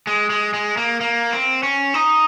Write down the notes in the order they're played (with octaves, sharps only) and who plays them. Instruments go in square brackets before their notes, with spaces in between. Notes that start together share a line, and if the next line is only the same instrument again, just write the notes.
[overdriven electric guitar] G#3
G#3
G#3
A#3
A#3
C4
C#4
D#4